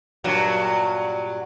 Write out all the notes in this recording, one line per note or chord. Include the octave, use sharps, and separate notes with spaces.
G2 A#2 F#3